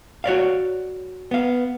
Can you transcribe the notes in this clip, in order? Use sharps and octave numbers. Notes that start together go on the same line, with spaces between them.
F#4 C#5 D5 F5
B3 F5